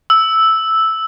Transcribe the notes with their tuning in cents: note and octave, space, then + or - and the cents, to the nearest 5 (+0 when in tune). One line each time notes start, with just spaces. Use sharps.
E6 -5